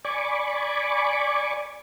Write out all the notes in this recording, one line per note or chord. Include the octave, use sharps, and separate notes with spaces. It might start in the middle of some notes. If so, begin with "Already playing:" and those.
D5 G#5 B5 C#6 D6